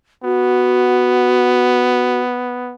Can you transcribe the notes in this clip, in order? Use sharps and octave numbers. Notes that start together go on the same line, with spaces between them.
B3 F#4